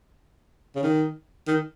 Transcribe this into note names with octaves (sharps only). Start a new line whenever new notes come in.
C#3
D#3
D#3